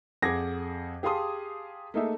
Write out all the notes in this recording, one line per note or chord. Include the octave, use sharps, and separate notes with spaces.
F2 G#4 F#5 D6 G#6 A#6
G4 G#4 F5 A5 C6 D#6
A3 A#3 D#4 G#4 E5